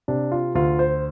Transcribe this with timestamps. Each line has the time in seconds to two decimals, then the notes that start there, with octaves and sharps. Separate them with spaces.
0.08 C3 D4
0.32 F4
0.55 D2 F4
0.79 C5